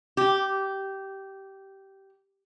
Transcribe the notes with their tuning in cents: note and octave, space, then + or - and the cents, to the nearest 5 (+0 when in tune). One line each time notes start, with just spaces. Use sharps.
G4 -15